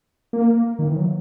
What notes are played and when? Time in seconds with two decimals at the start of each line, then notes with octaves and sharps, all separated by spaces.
0.33 A#3
0.79 D#3
0.88 E3
0.96 F#3